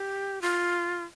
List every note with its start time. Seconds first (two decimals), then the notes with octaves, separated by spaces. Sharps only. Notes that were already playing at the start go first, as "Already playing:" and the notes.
Already playing: G4
0.42 F4